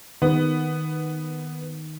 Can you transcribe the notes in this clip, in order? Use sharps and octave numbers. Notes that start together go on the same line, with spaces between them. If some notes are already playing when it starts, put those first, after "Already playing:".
D#3 B3